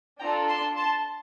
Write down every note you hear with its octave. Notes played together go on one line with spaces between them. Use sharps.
D4 F4 A4 G5 A#5
A5 C6
A5 C6